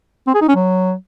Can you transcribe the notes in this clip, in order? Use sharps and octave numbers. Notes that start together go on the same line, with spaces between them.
C4
G#4
D#4
C#4
F#3